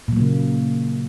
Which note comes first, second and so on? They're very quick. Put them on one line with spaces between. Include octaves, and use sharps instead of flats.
A#2 F#3 A#3 C#3